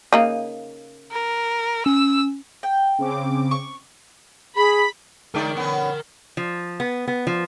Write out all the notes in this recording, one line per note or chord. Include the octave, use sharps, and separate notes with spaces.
C#3 A#3 D#4
A#4
C#4 E6
G5
C#3 C4 D6
C#6
G#4 B5
G#3 D#4 A#4 D5 G5
B3 C#4
F3
B3
B3
F3